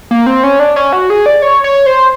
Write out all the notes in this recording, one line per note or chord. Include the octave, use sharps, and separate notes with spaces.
A#3
C4
C#4
D4
C#4
F#4
G#4
D5
C#5
C#5
C5